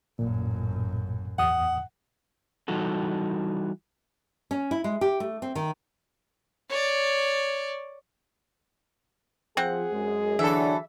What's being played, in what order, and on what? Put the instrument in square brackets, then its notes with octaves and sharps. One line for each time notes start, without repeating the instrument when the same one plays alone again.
[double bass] A1 F#2 [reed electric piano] A#2
[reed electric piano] E2 D#6 [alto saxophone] F#5
[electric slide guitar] E3 G3 D#4 F#4 A4
[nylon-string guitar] C#4
E4
G#3
G4
A3
C4
D#3
[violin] C#5 D5
[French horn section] F3 [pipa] C4 F#5 [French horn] G#4
[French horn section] F#2 G#3
[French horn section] D3 F#3 D4 [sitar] E3 A4 [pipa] E5